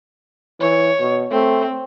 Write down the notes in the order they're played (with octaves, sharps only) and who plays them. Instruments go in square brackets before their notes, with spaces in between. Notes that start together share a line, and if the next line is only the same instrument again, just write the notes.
[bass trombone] E3 [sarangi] C#5
[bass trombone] B2
[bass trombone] A3 [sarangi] C4